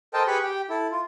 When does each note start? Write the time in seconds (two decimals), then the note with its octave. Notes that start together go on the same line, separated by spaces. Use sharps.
0.14 A4 A#4 C5 D#5 G5 A5
0.27 G4 G#4 B4 B5 C#6
0.43 G4 G5
0.70 E4 A4
0.91 F4